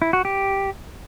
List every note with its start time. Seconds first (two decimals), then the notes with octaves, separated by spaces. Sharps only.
0.02 E4
0.13 F#4
0.25 G4